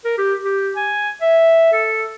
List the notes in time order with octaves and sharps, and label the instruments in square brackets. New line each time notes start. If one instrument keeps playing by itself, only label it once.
[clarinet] A#4
G4
G4
G#5
E5
A4